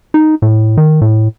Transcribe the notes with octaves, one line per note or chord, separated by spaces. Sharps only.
D#4
A2
D#3
A2